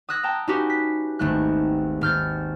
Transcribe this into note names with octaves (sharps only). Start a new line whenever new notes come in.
D#6 E6 F#6 G#6 A#6
G5 A5 A#5
C#4 D#4 E4 F#4 G4 B4
B6
G#1 D#2 A3 D#4 F#6
G#1 F6 G6 A6